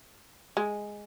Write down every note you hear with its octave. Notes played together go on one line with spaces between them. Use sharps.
G#3